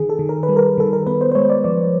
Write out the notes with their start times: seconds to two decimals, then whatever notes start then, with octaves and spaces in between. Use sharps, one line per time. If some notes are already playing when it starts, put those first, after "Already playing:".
Already playing: D#3 G#4
0.09 A4
0.19 D#3
0.29 A#4
0.43 B4
0.49 G3
0.56 A#4
0.78 D#3 A4
0.93 A#4
1.07 B3 B4
1.21 C5
1.32 C5
1.35 G#3 C#5
1.50 D5
1.64 F3 D5